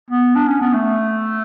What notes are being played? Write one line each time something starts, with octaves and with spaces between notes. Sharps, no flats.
B3
D4
C#4
B3
A3